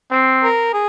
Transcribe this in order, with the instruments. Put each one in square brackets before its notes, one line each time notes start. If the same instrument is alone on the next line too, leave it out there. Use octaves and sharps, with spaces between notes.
[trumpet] C4
[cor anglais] A#4
G#4